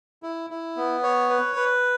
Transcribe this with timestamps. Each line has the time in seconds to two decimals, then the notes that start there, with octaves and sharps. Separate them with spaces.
0.23 E4
0.50 E4
0.77 B3
1.03 C#5
1.29 B4
1.56 B4